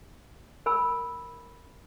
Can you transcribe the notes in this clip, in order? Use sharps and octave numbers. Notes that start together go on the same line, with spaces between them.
A#4 G#5 B5 E6